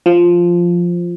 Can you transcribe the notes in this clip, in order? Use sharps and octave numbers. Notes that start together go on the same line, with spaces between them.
F3